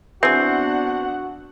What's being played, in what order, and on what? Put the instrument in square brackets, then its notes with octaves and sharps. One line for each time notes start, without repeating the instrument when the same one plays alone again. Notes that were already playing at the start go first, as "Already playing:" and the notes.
[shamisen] E3 G#4 [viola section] B3 D4 F#5 [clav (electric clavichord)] C4 [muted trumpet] F#4